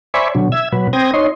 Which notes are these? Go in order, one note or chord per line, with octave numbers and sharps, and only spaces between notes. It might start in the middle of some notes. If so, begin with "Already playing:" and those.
C5 D5 E5 G#5 B5 C#6
B2 D3 F#3
E5 E6 G#6
B2 F#3 B4
C4 C5 G5 D#6 G#6 A#6
D#4 C#5 D#5 C6